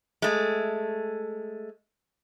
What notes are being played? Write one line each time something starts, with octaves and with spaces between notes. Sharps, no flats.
G#3 A3